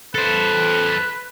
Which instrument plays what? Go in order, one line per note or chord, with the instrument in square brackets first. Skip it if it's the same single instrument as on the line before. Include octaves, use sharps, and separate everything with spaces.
[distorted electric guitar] A4 C5 [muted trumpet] B4